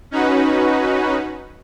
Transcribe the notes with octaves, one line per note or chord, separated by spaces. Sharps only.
C#4 D#4 F#4 B4